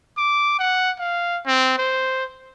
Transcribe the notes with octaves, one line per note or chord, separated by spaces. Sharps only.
D6
F#5
F5
C4
C5